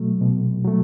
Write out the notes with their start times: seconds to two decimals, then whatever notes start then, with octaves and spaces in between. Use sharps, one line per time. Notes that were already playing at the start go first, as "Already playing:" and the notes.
Already playing: B2 F#3 A3
0.21 B2
0.64 F#3 A3